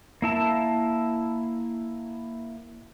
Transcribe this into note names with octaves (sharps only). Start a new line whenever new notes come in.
A#3 E4 A5